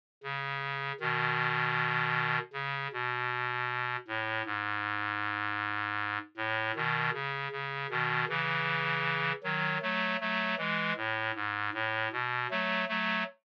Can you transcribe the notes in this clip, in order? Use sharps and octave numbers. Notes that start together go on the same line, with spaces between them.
C#3
B2 D#3
C#3
B2
A2
G#2
A2
B2 D#3
C#3
C#3
B2 D#3
C#3 E3
D#3 F#3
F#3 A3
F#3 A3
E3 G#3
A2
G#2
A2
B2
F#3 A3
F#3 A3